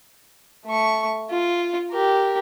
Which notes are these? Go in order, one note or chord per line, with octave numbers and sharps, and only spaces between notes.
A3 C#6
F4
G4 A#4